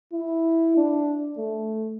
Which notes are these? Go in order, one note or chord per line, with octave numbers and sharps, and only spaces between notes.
E4
D4
A3